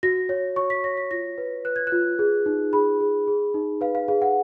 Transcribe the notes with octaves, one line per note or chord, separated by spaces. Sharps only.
F#4 A#6
C#5
C#5 C#6
B6
C#5 A#6
B6
F4 A#6
B4
B4 F#6
G#6
F4 F#6
G#4
D#4
G#4 B5
G#4
G#4
D#4
B4 F5
F5
G#4 F5
F#5